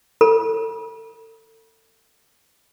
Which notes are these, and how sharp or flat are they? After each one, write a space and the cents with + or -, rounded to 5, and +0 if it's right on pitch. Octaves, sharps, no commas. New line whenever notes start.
A4 +35 B5 -40